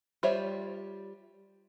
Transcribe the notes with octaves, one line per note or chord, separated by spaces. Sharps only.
G3 F4 C5 C#5 E5